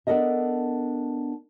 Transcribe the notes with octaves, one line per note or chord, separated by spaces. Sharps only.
B3 D4 A4 A#4 D#5 E5